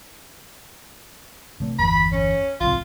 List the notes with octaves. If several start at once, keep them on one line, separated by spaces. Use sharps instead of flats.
C3 A3
G1 E2 B5
C#4
D1 C#2 C3 F4